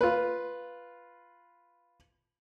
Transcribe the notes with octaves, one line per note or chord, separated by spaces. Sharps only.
F4 B4